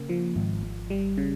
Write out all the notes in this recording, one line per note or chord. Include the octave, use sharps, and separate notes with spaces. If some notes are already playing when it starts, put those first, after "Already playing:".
Already playing: C#3 A#3
F3
G#1
G#1
G3
C#3